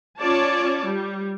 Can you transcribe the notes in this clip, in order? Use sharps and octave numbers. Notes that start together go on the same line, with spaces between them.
C#4 F4 C#5 D5 A5
G3